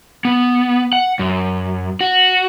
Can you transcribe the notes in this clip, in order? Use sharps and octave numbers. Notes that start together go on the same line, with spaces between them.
B3
F#5
F#2
F#4